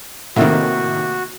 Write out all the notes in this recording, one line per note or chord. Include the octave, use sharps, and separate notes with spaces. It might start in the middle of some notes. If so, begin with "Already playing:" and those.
A2 C3 D#3 A#3 F#4 E5